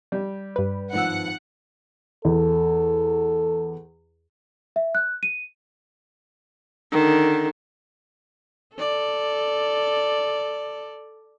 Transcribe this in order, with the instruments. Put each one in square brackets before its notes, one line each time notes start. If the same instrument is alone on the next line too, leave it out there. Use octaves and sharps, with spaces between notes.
[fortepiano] G3
[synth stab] G2 B4
[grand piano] G#1 F3 E6 [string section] F#5
[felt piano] E2 [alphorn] A4
[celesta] E5
F#6
D#7
[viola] D3 D#3
[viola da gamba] A4 D5